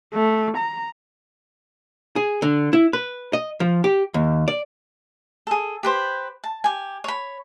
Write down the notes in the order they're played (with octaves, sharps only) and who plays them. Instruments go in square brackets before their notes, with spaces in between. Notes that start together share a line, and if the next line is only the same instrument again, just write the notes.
[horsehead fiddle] A3
A#5
[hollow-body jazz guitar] G#4
D3
E4
B4
D#5
F3
G4
D#2
D5
[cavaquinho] G#4 A4
G4 B4 C5
A5
G4 G#5
C#5 B5